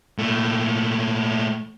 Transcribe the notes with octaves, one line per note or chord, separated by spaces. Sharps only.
A#2 A3